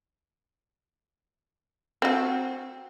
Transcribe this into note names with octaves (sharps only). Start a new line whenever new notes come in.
C4 F#4